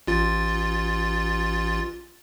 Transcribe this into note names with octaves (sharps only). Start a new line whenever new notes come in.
A1 F4 A6